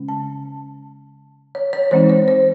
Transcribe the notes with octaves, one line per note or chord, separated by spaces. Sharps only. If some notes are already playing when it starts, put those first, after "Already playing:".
Already playing: C#3 G#3 C#4
A5
C#5
C#5
E3 G#3 C4 D#4 C5
C5
C5